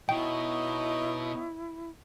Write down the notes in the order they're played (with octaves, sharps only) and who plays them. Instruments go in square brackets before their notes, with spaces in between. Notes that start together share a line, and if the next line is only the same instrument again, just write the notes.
[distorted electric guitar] B2 [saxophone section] D#4 C#5 D#5 [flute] E4 [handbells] G5